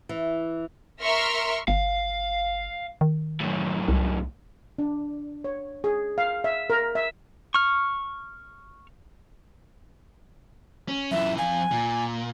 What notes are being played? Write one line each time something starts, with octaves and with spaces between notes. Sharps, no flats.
E3
A#4 E5 C6 C#6 F6
G1 F5
D#3
F#2 A2
C2
D4
C#5
G#4
F5
E5
A#4
E5
C#6 F6
C#4
F#2 E3 E5
F2 F5 G#5
A#2